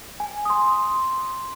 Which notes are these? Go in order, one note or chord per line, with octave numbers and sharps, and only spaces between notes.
G#5
D#6
C6